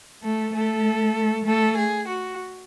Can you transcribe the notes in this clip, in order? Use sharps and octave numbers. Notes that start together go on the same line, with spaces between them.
A3 A4
A3 A4
A3 A4
G#4
F#4